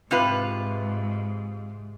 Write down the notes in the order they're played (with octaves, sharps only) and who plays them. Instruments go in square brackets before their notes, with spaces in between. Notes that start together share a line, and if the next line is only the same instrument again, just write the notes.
[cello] G#2 [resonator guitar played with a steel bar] C3 F4 B4